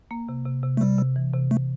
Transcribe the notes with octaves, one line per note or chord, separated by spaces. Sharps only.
A#3
C3
C3
C3
A3
C3 G3
C3
E3
C3
A3